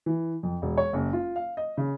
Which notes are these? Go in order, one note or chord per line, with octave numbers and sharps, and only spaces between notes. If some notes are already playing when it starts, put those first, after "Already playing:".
E3
F2
E1
C#5
F#1
F4
F5
D#5
C#3